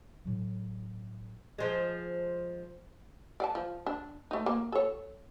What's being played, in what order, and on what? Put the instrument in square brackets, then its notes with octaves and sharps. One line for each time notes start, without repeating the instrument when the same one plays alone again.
[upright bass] A2 F#3
[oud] F3 G#3
[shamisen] D5 F#5 A5
F3
D4
A3 D#4
A#3
A4 C#5